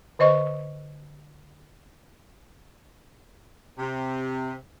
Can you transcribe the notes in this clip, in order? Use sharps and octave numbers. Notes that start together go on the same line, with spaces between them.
D3 C5 D#5 C#6
C3